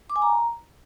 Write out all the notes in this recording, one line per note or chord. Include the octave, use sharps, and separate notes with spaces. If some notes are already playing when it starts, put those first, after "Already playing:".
D6
G#5
A#5